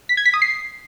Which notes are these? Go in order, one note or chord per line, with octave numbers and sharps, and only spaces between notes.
B6
G#6
B6
D#6
C7